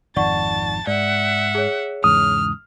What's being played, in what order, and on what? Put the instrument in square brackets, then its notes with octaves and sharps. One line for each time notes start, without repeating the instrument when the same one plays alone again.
[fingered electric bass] G#1 F2 D#3 [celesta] D5 F#5 C#6 [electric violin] A5 A6
[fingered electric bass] G#2 [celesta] D5 [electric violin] E5 F#5
[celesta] G#4 C#5
[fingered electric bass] E2 G#2 C#3 [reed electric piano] D#6 [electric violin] F6